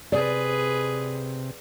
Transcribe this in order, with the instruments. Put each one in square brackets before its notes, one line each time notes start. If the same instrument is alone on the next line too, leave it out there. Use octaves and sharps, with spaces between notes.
[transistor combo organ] C3 [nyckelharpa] G#4 B4 [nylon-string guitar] D5